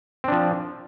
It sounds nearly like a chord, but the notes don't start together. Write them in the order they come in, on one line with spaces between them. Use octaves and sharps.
C4 D4 F3